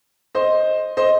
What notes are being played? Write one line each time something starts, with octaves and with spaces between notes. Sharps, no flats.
C5 D#5
C5 D#5